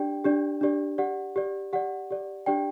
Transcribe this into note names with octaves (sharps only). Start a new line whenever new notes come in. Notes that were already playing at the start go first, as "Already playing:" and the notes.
Already playing: D4 G4 D5 G5
D4 G4 D5
D4 G4 D5
G4 D5 F#5
G4 D5
G4 D5 F#5
G4 D5
D4 G4 D5 G5